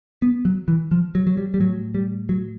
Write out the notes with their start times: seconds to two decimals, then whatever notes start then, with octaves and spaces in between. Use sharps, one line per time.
0.22 B3
0.45 F#3
0.68 E3
0.91 F3
1.15 F#3
1.27 F#3
1.37 G3
1.54 G3
1.60 A2 F#3
1.95 G3
2.29 F#3